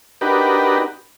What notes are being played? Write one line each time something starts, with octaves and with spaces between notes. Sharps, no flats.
D4 D#4 F#4 G4 A#4 B4